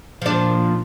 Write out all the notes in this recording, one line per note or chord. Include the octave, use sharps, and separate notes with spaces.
A#2 F3 D4